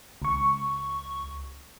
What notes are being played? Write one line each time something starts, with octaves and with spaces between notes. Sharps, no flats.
C#2 C#6